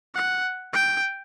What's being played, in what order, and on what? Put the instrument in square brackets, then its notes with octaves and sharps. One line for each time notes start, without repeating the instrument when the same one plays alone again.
[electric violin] F#5
G5